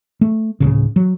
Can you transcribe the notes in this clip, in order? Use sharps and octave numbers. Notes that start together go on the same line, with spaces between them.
A3
D1 G1 C#3
F#3